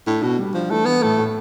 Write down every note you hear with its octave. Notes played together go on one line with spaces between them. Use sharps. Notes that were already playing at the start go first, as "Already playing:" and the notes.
A2 D4
B2 D4
G3
F3 D4
E3 A3
E3 B3
A2 A3
A2